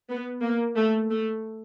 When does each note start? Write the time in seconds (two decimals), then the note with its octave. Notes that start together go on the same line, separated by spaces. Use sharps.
0.09 B3
0.42 A#3
0.76 A3
1.10 A3